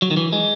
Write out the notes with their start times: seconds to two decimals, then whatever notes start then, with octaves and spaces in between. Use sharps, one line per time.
0.02 F#3
0.11 D#3
0.17 E3
0.33 G#3